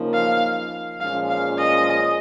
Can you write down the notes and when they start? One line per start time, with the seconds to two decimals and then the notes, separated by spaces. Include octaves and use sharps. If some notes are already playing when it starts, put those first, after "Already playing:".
Already playing: C#3 F3 A#3 D#4
0.14 F5
1.00 A#2 F3 G#3 C#4 F5
1.30 F5
1.58 D#5